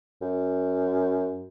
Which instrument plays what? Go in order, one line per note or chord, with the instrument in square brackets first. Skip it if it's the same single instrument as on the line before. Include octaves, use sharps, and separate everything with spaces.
[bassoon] F#2